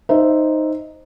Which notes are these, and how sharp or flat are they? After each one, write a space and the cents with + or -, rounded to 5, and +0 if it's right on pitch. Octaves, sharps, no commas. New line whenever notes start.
D#4 +0 C5 +0 E5 +0